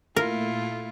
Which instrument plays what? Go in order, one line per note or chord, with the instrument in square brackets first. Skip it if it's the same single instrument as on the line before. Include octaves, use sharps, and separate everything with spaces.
[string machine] A#2 A3 [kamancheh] E4 F4 [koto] A#4